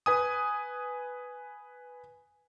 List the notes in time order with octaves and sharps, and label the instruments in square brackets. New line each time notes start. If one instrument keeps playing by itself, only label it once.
[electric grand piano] B4 G#5 D#6